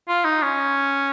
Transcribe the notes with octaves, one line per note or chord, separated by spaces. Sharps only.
F4
D#4
C#4